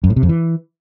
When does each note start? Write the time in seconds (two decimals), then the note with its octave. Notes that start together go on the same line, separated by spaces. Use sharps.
0.04 F#2
0.10 A2
0.16 C3
0.23 F2
0.29 E3